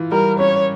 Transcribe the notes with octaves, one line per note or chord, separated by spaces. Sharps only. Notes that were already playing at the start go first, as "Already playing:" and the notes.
Already playing: E3 F4
G3 A#4
C#4 C#5